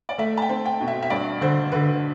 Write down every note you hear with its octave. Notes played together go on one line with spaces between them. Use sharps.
D5
A3 E5
A5
G5
C4
G5
B2
E5
E5
G2 D5
D3 C5
D3 B4